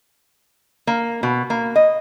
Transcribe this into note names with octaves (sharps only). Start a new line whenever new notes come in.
A#3
B2
A#3
D#5